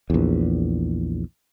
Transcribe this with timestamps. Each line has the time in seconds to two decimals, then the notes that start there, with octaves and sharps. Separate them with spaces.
0.10 A#1 E2